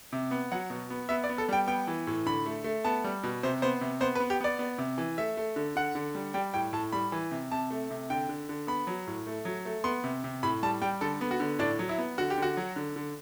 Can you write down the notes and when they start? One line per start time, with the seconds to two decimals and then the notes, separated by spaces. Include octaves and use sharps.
0.13 C3
0.31 B3
0.52 F#3 F#5
0.70 B2
0.90 B3
1.09 B3 E5
1.24 D5
1.29 B3
1.38 A4
1.49 G3 G5
1.67 B3 G5
1.87 E3
2.07 A2
2.26 D3 B5
2.46 A3
2.64 A3
2.85 B3 A5
3.04 G3
3.23 B2
3.43 C3 C5
3.62 B3 C5
3.81 C3
4.00 B3 C5
4.15 B4
4.20 B3
4.30 G4
4.41 B3 D5
4.59 B3
4.78 C3
4.98 E3
5.18 A3 E5
5.37 A3
5.56 D3
5.76 D3 F#5
5.95 D3
6.15 G3
6.34 G3 G5
6.54 A2 G5
6.73 A2 A5
6.93 G3 B5
7.12 E3
7.31 C3
7.52 C3 A5
7.70 A3
7.90 C3
8.10 D3 G5
8.29 D3
8.49 D3
8.67 B3 B5
8.87 F#3
9.07 A2
9.27 A3
9.45 F#3
9.65 A3
9.84 B3 C6
10.04 C3
10.24 C3
10.43 A2 B5
10.63 G3 A5
10.82 G3 G5
11.01 D3 A4
11.21 B3
11.31 F#4
11.40 D3
11.59 A2 D4
11.79 F#3
11.89 E4
11.98 B3
12.18 D3 F#4
12.30 G4
12.38 D3 F#4
12.57 F#3
12.76 D3
12.96 D3